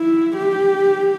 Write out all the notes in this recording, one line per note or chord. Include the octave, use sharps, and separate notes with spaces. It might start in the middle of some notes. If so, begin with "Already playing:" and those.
Already playing: E4
G4